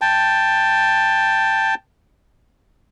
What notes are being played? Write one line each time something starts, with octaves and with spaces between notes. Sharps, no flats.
G5 A5